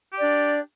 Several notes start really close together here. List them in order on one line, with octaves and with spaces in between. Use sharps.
G4 D5 D4